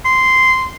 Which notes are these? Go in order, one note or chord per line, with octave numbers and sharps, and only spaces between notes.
C6